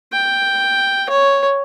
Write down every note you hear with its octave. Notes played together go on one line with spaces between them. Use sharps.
G5
C#5